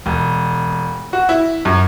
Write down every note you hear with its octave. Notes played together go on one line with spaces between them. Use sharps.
E1
F#4
E4
F#2